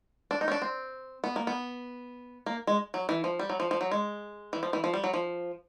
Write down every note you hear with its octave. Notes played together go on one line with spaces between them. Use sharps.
D4
D#4
C#4
D4
C4
B3
A#3
B3
A#3
G#3
F#3
E3
F3
G3
F#3
F3
F3
F#3
G#3
E3
F3
E3
F3
G3
F#3
F3